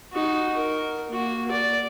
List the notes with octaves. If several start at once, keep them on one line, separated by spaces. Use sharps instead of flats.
D#4 F#4
A#4
A#3 F#4
D5